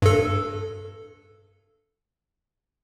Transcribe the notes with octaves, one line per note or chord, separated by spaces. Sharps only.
G2 A4